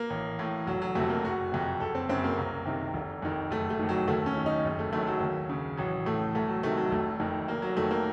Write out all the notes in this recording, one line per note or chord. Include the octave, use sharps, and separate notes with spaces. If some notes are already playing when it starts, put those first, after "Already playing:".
Already playing: A#3
A1
A2
F1 F#3
F#3
F2 C3 A3
A#3
F#1 F#4
F2 C3
F#1 A4
C4
F#2 C#3 C4
A#3
C2
C3 D#3
F1
F2 D#3
F#1 A3
A3
F2 D#3
F#3
D#2 A3
C#4
D#3
D#4
F#1
A3
F#2 D#3 A3
F#3
D#2
C#3
A1 F#3
A2 A3
C2 A3
F#3
C3 D#3 A3
F#3
F1 A3
F2 D#3
F1 A#3
F#3
F2 D#3 A3
A#3